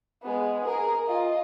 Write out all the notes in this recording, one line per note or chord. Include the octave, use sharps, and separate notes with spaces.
G#3 B3
G#4 A#4
F4 D#5